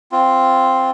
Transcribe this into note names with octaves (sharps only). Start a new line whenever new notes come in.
C4 F4